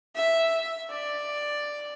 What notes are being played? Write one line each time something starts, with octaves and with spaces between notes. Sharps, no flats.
E5
D5